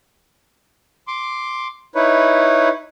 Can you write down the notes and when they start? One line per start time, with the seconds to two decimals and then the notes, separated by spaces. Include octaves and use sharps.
1.08 C6 D6
1.95 D#4 E4 B4 C#5